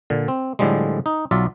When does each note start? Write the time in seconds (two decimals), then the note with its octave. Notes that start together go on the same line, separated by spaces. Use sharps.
0.10 A#2 D3
0.28 C4
0.59 A2 D3 F3 G3 G#3
1.06 D#4
1.31 B1 F#3 F4 D5 E5